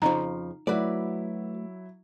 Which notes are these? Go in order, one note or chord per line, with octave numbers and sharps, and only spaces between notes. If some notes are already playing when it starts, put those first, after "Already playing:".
F2 C#3 F3 D#4 A#5
F#3 A3 E4 F#4 B4 D5